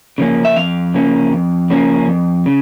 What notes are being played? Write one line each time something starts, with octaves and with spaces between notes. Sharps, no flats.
C#3 F3 A#3 C#4
E5
F2 F5
C#3 F3 A#3 C#4
F2
C#3 F3 A#3 C#4
F2
C#3